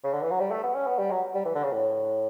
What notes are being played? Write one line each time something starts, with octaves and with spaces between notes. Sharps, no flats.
C#3
D3
E3
F#3
G3
A3
B3
C#4
B3
G3
F#3
G3
E3
D3
C#3
A2